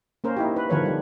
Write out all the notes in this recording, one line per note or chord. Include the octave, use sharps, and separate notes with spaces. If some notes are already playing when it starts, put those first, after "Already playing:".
A#3 C#4 A#4 C5
D#4 E4 G4
B4
D3 D#3 F3 A#4 B4 C#5
G3